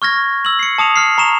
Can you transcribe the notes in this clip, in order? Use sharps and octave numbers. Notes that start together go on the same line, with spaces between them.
C#6 F6 G#6 A#6
E6 F#7
C7 C#7
A5 D#6 C#7 F7
F6 C7
A#5 C#6 E7 F7